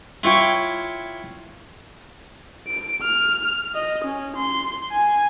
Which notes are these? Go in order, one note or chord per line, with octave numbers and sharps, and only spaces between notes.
E4 F4 C#5 G5
D7
F6
D#5
C#4
C6
G#5